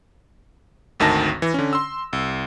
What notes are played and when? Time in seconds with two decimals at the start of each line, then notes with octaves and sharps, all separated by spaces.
1.00 G#1 D2 D#3 A5 A#6
1.42 E3
1.54 D3 C#4
1.73 C6 E6
2.13 C2